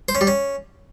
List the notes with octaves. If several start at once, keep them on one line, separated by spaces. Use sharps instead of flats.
C5
C#4
G3
C#4